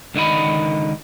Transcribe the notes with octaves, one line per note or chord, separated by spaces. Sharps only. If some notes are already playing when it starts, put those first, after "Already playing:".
C#2 D3 D#3 D#5 B5